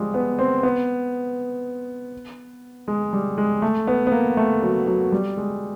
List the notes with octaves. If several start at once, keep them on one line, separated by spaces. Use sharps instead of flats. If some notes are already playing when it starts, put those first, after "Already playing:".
Already playing: F3 G3 G#3
B3
C4
B3
G#3
G3
G#3
A3
B3
B3
A#3
A3
F#3
F#3
G3
G#3